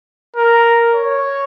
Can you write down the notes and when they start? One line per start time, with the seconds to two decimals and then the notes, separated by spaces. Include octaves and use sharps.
0.36 A#4
0.95 C#5